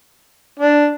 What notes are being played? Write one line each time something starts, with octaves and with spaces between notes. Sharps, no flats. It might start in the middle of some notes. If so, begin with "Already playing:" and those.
D4